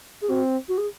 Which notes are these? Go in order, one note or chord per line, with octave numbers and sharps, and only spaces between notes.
G#4
C4 F#4
F#4
G#4